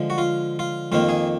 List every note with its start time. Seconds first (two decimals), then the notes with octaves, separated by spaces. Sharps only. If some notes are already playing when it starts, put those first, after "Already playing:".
Already playing: D3 F3 G#3
0.10 F#4
0.18 F4
0.59 F4
0.92 F2 D#3 A#3 F4
1.09 G#4